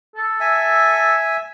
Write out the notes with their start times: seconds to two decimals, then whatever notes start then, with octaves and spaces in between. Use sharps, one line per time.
0.16 A4
0.40 E5 G#5